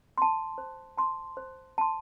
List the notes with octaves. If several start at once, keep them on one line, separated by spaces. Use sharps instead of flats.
A5 C6
C5
A5 C6
C5
A5 C6